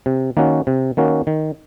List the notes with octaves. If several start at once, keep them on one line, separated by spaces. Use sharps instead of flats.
C3
D#3 A#3 C#4 F#4
C3
D#3 A#3 C#4 F#4
D#3